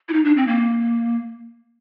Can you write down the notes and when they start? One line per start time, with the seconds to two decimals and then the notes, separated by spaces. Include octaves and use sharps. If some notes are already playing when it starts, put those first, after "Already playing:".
0.09 E4
0.13 D#4
0.25 D4
0.37 C4
0.48 A#3